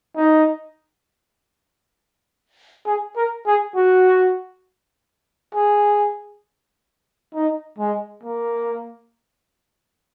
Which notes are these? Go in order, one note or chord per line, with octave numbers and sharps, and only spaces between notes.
D#4
G#4
A#4
G#4
F#4
G#4
D#4
G#3
A#3